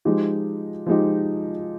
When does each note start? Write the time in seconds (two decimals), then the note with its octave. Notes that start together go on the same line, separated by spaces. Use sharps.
0.05 F3 G#3 D#4 G4
0.86 F3 G#3 D#4 G4